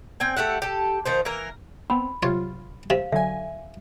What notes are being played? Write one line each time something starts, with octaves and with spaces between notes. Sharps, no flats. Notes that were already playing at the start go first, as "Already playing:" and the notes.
C4 G5 G#5
A3 G4 E5 F#5
G4 A4
D#3 F3 C5
E3 A#3 A#4
B3 C4 B5
C3 F#3 F4 C#5
C3 F5
D3 F#3 E5 G#5